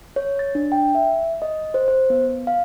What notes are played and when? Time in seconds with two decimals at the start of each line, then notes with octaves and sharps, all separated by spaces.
0.16 C#5
0.39 A6
0.55 D4
0.72 G5
0.95 E5
1.42 D#5
1.74 C5
1.88 C5
2.10 B3
2.47 F5